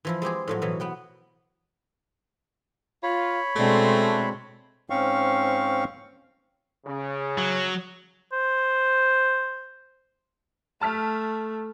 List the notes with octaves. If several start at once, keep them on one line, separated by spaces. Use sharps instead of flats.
E3 F3 E4
G#3 C4 G4 G#4
A2 F3 F#3
B2 E3 F#3
B3 F#5 G5
F4 C#5 B5
B2 G#3 A3 C4 D4
G#2 C4 C#4 F5 C#6
C#3
F#3
C5
A3 A5 F6 B6